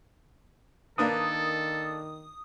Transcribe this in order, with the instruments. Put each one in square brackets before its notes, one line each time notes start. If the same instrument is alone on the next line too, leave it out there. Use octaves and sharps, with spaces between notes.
[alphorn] D#3 [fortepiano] A#3 D4 B4 [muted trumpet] A4 [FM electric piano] D#6